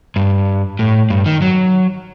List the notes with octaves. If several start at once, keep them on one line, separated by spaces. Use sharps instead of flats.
G2
A2
G2
D#3
F#3